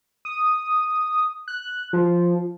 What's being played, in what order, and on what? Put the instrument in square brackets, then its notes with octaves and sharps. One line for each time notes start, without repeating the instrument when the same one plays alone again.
[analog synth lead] D#6
F#6
F3